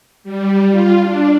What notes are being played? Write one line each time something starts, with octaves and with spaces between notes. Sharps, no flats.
G3
F4
D4